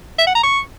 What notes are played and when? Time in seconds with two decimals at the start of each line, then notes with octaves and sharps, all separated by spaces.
0.19 E5
0.27 F#5
0.35 A#5
0.43 C#6